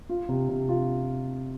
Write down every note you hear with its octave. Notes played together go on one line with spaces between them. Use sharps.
F4
C3
C3
F4